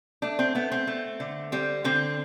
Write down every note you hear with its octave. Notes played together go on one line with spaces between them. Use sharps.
A3 D4
C4
A3 B3
C4
A3
D3
G3 C4
D3 C4